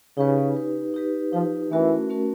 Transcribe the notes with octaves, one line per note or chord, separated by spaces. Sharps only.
C#3 D#4 G4 B4
D#4 G4 B4
D#4 G4 B4
F3 D#4 G4 B4
E3 A3 C#4 F#4 A#4
A3 C#4 F#4 A#4